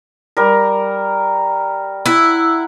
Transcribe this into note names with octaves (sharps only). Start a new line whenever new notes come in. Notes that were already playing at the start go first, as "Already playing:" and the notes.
G3 A#4
E4 F#5